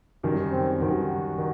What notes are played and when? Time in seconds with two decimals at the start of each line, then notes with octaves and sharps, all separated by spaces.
0.23 F#2 D#3 G3
0.51 C4
0.80 F#2 D#3 G3 F#4
1.38 D#3